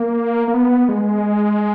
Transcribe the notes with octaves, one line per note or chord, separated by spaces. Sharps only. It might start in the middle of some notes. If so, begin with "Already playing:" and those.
Already playing: A#3
A#3
B3
G#3